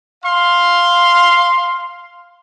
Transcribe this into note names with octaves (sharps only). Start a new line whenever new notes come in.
F5 C6